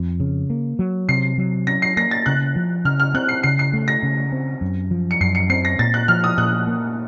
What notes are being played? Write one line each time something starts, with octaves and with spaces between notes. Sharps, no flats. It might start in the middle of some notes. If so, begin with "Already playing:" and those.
Already playing: F2
C#3
A#3
F#3
C3 C7
F#3
C#4 A#6
C7
A#3 A#6
A6
C#3 F#6
F3
C#3 F6
F6
C4 F#6
C7
C#3 C7
C7
A3
A#6
C#3
C4
F#2
F3
C#7
F#2 C7
C#7
C4 C7
A#6
A#2 A6
F#6
F3 F6
D#6
A#2 F#6
A#3